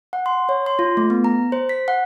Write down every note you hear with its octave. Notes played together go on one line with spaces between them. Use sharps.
F#5
C6
C#5
C6
F4
A3
B3
A#5
C5
B6
F#5